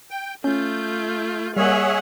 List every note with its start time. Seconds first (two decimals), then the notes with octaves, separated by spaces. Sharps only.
0.11 G5
0.44 A3 C#4 F4 G6
1.56 G3 A#3 G#4 C#5 D#5 E5 F#5